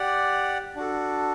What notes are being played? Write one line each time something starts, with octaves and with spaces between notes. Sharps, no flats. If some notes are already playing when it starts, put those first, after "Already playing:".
Already playing: G4 D5 F#5
D4 F#4 A4